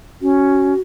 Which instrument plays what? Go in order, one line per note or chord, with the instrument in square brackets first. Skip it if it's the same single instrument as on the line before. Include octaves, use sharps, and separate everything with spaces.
[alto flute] C#4 [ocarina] F#4